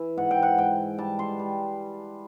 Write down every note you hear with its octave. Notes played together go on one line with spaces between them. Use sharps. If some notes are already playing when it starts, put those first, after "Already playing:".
Already playing: E3
G#2 F#5
G5
F#5
G#2 G5
G3 A5
C6
G3